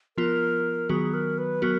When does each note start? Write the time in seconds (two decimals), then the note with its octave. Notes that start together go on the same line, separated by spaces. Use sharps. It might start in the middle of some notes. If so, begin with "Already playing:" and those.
0.17 F3 B3 F4 A#4
0.89 D#3 F#3 B3 F#4 G#4
1.14 A#4
1.38 B4
1.62 F#3 B3 F#4 A#4